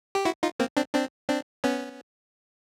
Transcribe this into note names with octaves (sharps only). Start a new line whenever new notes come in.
G4
E4 F#4
D#4 F4
A#3 C4
C4 D4
C4 D4
C4 D4
B3 C#4